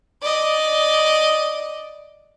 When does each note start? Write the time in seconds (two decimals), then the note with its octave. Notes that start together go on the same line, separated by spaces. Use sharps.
0.22 D5 D#5